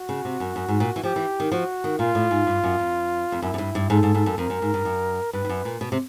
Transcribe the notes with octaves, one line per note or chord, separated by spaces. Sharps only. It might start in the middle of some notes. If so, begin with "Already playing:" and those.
Already playing: F#4
C#3
C3
F#2
F#2
G#2
A#2
E3
F3 G4
E3
D#3
F3 F#4
D#3
A#2 F4
A2
G#2
G2
F#2
F2
F2
F#2 E4
F#2
G2
G2
G#2 A4
G#2
G#2
F#2
F2 A#4
F#2
G#2
G2
F#2
G2 B4
G2
F#2
A#2
B2
C3